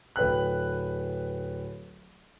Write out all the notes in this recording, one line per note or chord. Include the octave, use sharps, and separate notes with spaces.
D1 B4 G5 F#6